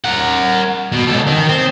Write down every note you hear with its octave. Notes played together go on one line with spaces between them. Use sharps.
A#4 F#5
B2
C#2 A4
D#3
C4